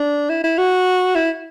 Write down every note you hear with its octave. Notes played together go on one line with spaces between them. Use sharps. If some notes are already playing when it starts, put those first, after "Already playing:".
Already playing: D4
E4
E4
F#4
E4